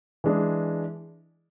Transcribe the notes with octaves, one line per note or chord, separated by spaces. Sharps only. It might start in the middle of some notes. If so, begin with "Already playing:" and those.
E3 G#3 D4